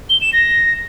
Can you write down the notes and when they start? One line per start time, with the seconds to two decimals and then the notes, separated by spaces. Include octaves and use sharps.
0.10 G7
0.21 E7
0.33 A#6